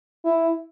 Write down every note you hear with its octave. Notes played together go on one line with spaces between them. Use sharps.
E4